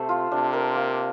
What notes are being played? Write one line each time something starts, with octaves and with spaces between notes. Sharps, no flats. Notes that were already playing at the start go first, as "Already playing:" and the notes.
Already playing: C3 A3 C5
F4
C3 D4
A#4
A#3